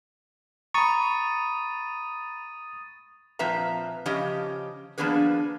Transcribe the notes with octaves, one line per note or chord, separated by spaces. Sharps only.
A#5 B5 C#6 D#6 A6 D#7
A#2 F3 C4 B4 E5 A#5
C#3 F3 C#4 G4 D#5
F3 A#3 B3 D4 G#4 B4